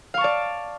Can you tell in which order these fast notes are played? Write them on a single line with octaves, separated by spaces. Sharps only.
F5 C#6 A5 D5